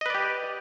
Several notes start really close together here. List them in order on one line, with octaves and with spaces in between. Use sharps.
D#5 B4 D5 G4